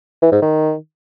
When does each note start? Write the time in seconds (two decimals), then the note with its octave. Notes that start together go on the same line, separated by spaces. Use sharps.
0.22 E3
0.32 G#2
0.42 D#3